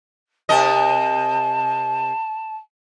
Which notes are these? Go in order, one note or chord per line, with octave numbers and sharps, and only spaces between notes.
C3 A#4 D#5 A5